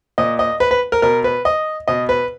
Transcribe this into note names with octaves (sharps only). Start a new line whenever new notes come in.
A#2 D#5
D#5
B4
B4
A#4
B2 A#4
B4
D#5
B2 D#5
B4